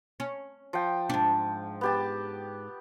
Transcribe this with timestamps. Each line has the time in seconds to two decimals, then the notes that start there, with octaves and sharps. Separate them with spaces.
0.20 C#4
0.73 F3 G5
1.10 G#2 D4
1.81 B3 G4 A5